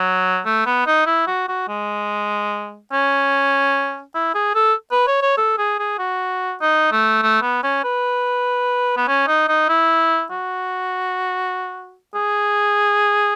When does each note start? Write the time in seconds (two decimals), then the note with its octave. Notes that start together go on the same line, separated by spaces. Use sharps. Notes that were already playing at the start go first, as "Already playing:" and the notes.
Already playing: F#3
0.45 A3
0.66 B3
0.86 D#4
1.07 E4
1.27 F#4
1.48 F#4
1.68 G#3
2.92 C#4
4.14 E4
4.34 G#4
4.55 A4
4.92 B4
5.07 C#5
5.22 C#5
5.38 A4
5.58 G#4
5.79 G#4
5.99 F#4
6.61 D#4
6.92 A3
7.23 A3
7.42 B3
7.63 C#4
7.84 B4
8.97 B3
9.08 C#4
9.27 D#4
9.48 D#4
9.69 E4
10.31 F#4
12.14 G#4